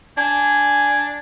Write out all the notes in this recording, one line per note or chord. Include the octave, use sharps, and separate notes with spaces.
D4 G#5